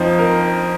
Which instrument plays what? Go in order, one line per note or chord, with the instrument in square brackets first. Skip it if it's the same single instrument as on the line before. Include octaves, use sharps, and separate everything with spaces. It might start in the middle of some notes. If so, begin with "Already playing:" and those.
Already playing: [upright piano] F2 F3 D#4 [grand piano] C5
[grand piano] A#4